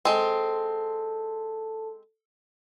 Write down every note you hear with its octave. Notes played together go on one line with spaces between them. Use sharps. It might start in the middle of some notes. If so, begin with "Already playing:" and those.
G#3 C4 A4 A5